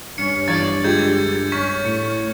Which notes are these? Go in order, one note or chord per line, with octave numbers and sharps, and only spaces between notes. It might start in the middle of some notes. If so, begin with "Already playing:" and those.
G2 C#4 C#7
E3 D5 C#6 G#6 A6
D3 G#3 F4 G4 G6 G#6
C#4 C#6 B6
A2 C#7